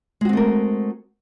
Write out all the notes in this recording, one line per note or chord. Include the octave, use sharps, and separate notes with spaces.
G#3 A3 C4 F#4 A#4